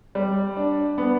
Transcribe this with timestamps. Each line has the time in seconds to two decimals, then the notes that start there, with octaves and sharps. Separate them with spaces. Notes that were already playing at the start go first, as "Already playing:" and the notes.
0.15 G3
0.57 D4
0.98 B3